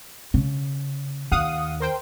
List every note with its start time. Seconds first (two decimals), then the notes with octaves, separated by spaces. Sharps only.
0.34 C#3
1.31 D#2 F5 F#5 D#6
1.80 A#4 C5 G5